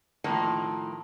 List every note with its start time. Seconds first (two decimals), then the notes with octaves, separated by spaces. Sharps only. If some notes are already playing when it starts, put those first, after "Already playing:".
0.24 A2 D#3 F3 A#3